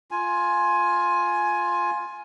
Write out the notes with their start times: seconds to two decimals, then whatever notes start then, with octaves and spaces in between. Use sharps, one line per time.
0.11 F4 G#5